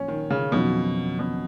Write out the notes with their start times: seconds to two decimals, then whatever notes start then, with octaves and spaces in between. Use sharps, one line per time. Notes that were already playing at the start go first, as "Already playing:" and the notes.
Already playing: A#1 A#2 F#3 C#4
0.08 D#3
0.30 C#3
0.52 F2 B2 D#3 F#3 C#4
1.19 B2